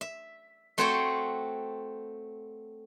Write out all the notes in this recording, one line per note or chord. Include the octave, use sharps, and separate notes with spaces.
E5
A3 C4 F#4 C5 C#5 G5